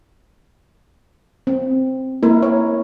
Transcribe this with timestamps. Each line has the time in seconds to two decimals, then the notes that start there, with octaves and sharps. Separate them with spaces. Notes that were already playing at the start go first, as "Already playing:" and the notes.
1.47 C4
2.23 A#3 E4 A#4
2.43 C#5